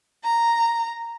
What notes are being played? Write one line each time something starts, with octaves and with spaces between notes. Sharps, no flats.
A#5